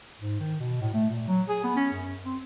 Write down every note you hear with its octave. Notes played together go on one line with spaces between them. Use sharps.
G#2
D#3
B2
A2
A3
A#2
F#3
G#4
B3
C#4
F#2
C4